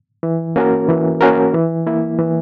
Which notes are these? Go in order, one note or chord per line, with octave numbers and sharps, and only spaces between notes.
E3
A#3 C#4 F#4 A#4
E3
A#3 C#4 F#4 A#4
E3
A#3 E4
E3